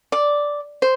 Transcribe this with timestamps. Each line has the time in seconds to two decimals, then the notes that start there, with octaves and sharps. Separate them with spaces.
0.12 D5
0.82 C5